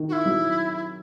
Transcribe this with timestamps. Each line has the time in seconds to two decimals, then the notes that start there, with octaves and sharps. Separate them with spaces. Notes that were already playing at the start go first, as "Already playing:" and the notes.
Already playing: D#3
0.08 F#4
0.12 E4
0.25 F#3